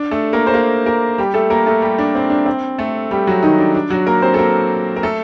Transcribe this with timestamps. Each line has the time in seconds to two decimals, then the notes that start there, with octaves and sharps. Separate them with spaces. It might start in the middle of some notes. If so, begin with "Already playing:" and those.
Already playing: D4
0.11 A3 A4
0.33 A#3 A#4
0.47 C5
0.54 A#3 A#4
0.86 A#3 A#4
1.18 G3 G4
1.34 A3 A4
1.50 A#3 A#4
1.66 A3 A4
1.82 G3 G4
1.98 D4
2.15 C4
2.30 D4
2.46 C4
2.79 A3 A4
3.11 G3 G4
3.27 F#3 F#4
3.43 D#3 D#4
3.58 D4
3.74 D4
3.90 F#3 F#4
4.07 A#3 A#4
4.22 C4 C5
4.34 A4
4.38 A#3 A#4
4.97 A#4
5.03 A3 A4